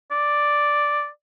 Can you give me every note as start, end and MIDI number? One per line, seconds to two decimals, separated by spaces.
0.11 1.08 74